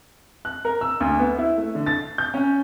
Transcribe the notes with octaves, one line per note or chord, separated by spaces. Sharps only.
F#6
A#4
E6
D2
B3
E4
A3
D3
A6
G6
C#4